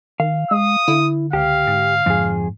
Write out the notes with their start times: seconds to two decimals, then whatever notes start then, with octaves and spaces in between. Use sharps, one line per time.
0.20 D#3 F5
0.51 G#3 D#6
0.88 D3 E4
1.33 C#2 G4 F5
1.67 G#2
2.06 F2 G#2 G#4